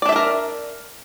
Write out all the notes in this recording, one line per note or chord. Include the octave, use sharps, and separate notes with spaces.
D4 A4 A#4 D5 E5